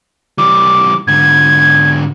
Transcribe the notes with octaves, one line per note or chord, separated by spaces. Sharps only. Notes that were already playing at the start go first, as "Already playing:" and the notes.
E3 G3 D6
G#2 D3 G#6